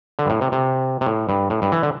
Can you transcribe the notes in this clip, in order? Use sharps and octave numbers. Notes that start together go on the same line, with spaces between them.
D3
G2
A2
C3
C3
C3
A2
G2
A2
G2
E3
D3